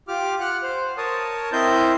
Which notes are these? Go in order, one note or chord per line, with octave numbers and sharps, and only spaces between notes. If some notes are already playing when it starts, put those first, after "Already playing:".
F4 G4 D6 F6
F#5 F6 F#6
C5
A#4 C#5 A5 D#6
C4 E4 A#4 C5 D#5 G6